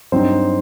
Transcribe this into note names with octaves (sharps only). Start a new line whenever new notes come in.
G2 F#3 C4 D#4 C5